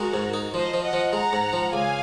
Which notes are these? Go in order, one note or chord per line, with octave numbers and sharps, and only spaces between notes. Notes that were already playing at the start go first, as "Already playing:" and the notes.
Already playing: G#3 F#4 A#4
G#2
D#4
F3 C5 D#5
F3
D#5 F#5
F3
G#3 F#5 A#5
G#2
F3
C#2 F5 G#5